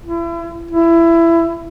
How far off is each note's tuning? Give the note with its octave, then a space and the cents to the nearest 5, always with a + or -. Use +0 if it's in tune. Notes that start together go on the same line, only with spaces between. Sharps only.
E4 +35
E4 +20